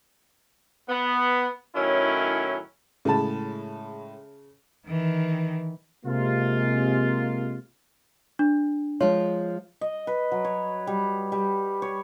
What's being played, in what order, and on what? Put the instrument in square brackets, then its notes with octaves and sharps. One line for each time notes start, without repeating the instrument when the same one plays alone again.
[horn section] B3
A2 D#3 F#3 C#4 E4
[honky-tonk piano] A2 G#3 B5 [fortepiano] C#3 A5
[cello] D#3 E3
[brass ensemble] C3 G#3 A#3 F4
[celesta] D4
[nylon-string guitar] F3 G#3 F4 [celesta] C#5
[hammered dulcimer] D#5
B4
F#3
C#5
G3
G3
C#5